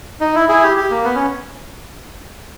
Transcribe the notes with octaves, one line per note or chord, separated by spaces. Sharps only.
D#4
E4
E4 G#4
G4
G4
A#3
B3
C#4